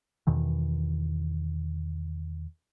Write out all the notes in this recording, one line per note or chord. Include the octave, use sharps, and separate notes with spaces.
E2 B2 D#3 E3